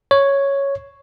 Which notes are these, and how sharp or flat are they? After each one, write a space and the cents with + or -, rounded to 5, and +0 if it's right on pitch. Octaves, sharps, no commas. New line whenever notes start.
C#5 +0